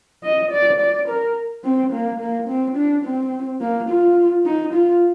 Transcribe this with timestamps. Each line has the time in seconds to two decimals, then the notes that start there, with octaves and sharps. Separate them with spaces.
0.24 D#5
0.51 D5
0.80 D5
1.08 A#4
1.64 C4
1.93 A#3
2.20 A#3
2.48 C4
2.76 D4
3.05 C4
3.61 A#3
3.89 F4
4.45 D#4
4.73 F4